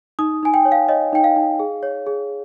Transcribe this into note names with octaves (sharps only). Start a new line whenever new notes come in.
D#4 D#6
D#4 G#5
G5
C#5
F5
C#5 D#5
D#4 G5
F5
D#4
G#4
C#5
G#4